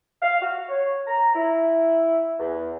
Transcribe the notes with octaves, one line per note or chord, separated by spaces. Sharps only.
F5
F#4
C#5
A#5
E4
E2